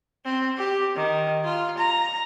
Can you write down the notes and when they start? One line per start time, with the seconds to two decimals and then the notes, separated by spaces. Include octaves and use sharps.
0.25 C4
0.58 G4
0.96 D#3
1.44 F4
1.78 A#5